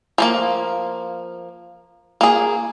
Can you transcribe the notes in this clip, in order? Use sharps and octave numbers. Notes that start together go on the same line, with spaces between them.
F3 A3 A#3
A#3 G#4